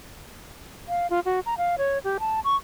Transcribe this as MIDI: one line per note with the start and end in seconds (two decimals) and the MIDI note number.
0.88 1.07 77
1.10 1.20 65
1.25 1.40 66
1.46 1.54 82
1.58 1.75 77
1.78 1.98 73
2.04 2.18 67
2.20 2.40 81
2.44 2.56 85